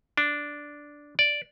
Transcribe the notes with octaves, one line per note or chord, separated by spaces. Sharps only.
D4
D5